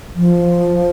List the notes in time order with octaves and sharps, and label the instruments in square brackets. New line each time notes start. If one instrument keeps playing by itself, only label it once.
[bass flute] F3